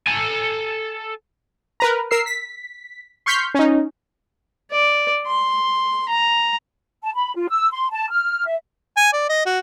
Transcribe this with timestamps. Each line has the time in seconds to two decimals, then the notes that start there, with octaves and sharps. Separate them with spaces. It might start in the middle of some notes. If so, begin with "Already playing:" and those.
0.07 A4 G#5
1.80 A#4 B4 A#5
2.11 A#4 E6 C7
2.26 B6
3.26 C6 C#6 F6 G6 B6 C7
3.55 C#4 D#4
4.71 D5
5.27 C6
6.09 A#5
7.03 A5
7.15 B5
7.36 F4
7.49 E6
7.71 C6
7.92 A5
8.11 F6
8.46 E5
8.97 G#5
9.13 D5
9.29 D#5
9.46 F#4